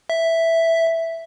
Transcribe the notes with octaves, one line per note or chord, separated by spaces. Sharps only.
E5